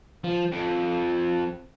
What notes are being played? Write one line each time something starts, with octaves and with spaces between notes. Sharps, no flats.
F3
F2